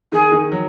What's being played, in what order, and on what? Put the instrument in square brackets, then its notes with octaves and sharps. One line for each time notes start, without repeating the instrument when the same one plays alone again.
[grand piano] D#3 [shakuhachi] G#4
[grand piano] D#3
F#3